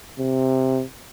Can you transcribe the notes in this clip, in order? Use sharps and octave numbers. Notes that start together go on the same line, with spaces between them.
C3